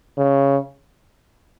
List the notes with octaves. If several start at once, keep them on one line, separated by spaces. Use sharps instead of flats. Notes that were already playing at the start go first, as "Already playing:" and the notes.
C#3